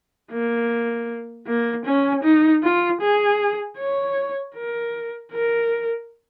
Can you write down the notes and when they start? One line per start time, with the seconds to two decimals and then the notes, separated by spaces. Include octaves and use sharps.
0.32 A#3
1.47 A#3
1.86 C#4
2.24 D#4
2.63 F4
3.01 G#4
3.78 C#5
4.55 A#4
5.32 A#4